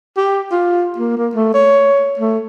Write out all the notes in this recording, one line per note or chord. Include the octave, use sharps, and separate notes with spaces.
G4
F4
A#3
A#3
A3
C#5
A3